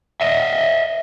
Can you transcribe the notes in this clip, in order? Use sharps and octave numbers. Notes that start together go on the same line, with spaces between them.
D#5 E5